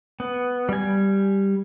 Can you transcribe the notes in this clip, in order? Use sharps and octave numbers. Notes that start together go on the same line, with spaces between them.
B3
G3 G#5